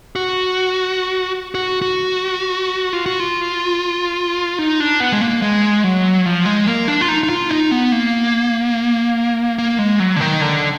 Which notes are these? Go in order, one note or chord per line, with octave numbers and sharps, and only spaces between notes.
F#4
F#4
F#4
F4
F#4
F4
D#4
D4
B3
G#3
A#3
G#3
F#3
F3
G#3
A#3
D4
F4
D#4
D#4
F4
D#4
B3
A#3
A#3
G#3
F#3
D3
D#3
D3